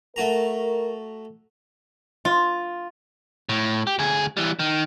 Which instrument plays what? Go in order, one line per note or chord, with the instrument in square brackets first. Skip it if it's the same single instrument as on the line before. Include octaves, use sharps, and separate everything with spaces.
[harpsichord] A3 F#4 A#5 [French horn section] A#4
[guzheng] F4
[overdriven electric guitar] A2
G4
D2 G#4
E3 G3
D#3